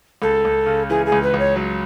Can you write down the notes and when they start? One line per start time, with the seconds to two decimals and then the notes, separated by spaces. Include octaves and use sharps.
0.22 C#2 A4
0.45 C#2
0.66 C#3
0.89 E3 G#4
1.06 G#4
1.12 C#2
1.23 B4
1.34 C#2
1.39 C#5
1.56 F#3